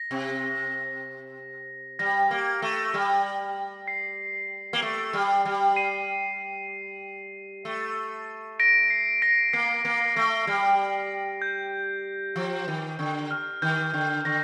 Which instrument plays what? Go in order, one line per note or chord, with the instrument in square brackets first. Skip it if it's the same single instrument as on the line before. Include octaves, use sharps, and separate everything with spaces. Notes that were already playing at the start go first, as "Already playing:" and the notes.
Already playing: [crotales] A#6
[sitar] C3
[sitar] G3 [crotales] A#6
[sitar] A#3
A3
G3
[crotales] C7
[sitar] A#3
A3
G3
G3
[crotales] C7 D#7
[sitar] A3
[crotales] A#6 D7
C7
A#6 D7
[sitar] A#3 [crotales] C7
[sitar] A#3
A3
G3
[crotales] G6
[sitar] F3
D#3
D3
[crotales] F6
[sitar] D#3 [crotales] G6
[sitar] D3
[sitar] D3 [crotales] A#6